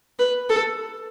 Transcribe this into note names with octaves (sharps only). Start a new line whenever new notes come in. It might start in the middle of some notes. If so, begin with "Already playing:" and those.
B4
A4